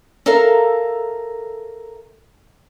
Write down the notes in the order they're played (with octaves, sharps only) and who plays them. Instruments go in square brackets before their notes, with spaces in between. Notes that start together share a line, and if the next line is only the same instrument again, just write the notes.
[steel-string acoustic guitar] A4 A#4 E5 F5 A#5